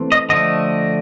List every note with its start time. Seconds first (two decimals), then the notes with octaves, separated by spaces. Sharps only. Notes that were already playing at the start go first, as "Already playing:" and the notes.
Already playing: E3 A3 C4
0.12 D#5
0.29 D3 F3 A3 D#5